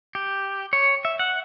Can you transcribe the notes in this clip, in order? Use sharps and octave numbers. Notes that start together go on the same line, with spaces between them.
G4
C#5
E5
F#5